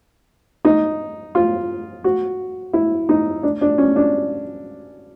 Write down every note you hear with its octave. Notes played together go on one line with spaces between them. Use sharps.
D#4
F4
F#4
E4
D#4
D4
D4
C#4
D4